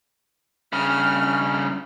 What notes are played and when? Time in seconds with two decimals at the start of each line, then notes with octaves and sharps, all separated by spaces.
0.73 G2 C#3 F6